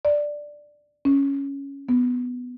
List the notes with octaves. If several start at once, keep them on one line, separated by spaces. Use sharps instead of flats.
D5
C#4
B3